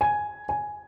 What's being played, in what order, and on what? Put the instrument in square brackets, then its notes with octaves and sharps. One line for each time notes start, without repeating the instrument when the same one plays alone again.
[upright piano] G#5
G#5